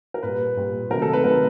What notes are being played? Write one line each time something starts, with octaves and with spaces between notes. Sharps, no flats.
A#4
A#2 G3 B4
A#2 G3
C3 D#3 F#3 A3 A#4
A4
B4
C3 D#3 F#3 A3 A#4